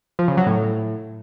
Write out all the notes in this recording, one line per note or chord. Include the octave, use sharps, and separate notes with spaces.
F3
C#3
F#3
A2